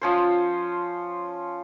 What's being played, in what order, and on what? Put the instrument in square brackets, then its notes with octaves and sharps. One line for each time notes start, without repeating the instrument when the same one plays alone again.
[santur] F3 C#4 C5